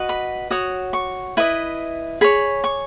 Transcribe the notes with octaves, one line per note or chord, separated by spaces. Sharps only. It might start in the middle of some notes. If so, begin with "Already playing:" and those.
Already playing: F#4 B4 D#5
B5
F#4 C#5 D#6
C#6
E4 B4 D#5
G#4 C#5 B5
C#6